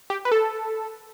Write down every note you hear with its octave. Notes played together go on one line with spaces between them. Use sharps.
G4
B4
A4